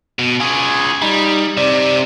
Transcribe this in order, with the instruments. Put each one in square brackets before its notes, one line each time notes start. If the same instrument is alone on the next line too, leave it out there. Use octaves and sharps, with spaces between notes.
[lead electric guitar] B2
[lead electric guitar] F4 G#4 [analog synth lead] G#5
[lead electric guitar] G3 [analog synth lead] D#4
[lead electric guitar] C3 [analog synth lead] D5